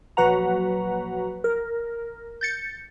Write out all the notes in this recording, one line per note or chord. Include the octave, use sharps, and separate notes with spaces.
A#1 F#3 F#4 B4 F#5 A#5
A#4
G6 A6 C#7